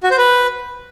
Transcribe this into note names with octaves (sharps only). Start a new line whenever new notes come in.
F#4
C5
B4